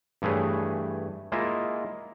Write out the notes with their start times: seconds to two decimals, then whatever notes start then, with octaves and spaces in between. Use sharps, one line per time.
0.22 G2 E3 A3 G#4 B4 C#5
1.32 G#3 A#3 E4 F4 D#5 E5